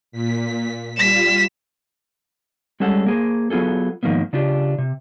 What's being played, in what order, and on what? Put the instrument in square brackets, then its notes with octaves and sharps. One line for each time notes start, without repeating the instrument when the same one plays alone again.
[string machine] A#2 B6
[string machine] G3 F4 [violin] B6 E7
[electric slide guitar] G3 G#3 C#4 A4 F#5
A#3 G#4 C5
F#3 B3 F4 G#4 A4
G#2 D#3 F3 A#3 B3
C#3 D4 F4 G4
C3